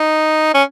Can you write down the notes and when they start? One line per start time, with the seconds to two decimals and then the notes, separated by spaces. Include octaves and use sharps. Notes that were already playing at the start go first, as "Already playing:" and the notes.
Already playing: D#4
0.54 C#4